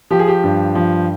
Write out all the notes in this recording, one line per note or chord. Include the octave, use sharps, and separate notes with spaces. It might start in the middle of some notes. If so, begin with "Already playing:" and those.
F3 G4
G#4
G4
G2
F3